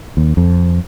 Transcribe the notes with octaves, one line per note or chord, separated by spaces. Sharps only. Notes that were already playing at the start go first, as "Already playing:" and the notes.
D#2
F2